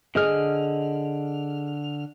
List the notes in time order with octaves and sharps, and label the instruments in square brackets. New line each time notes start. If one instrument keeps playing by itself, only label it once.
[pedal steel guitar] D3 F6 [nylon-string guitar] G#4 D#5